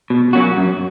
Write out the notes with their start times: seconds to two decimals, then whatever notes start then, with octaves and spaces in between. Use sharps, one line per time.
0.10 B2
0.33 F#3 A#3 C#4 F#4
0.57 F#2